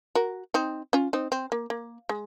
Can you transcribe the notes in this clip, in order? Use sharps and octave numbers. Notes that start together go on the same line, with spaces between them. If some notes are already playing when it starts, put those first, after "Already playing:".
F#4 A#4
C4 D#4
C#4 F4
C4 D#4
C4
A#3
A#3
G#3